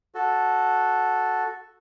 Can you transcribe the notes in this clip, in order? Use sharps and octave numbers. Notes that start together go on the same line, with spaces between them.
F#4 A4